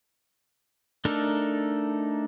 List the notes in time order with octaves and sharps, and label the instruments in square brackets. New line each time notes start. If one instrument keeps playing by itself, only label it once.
[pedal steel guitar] A3 D4 D#4 A4 A#4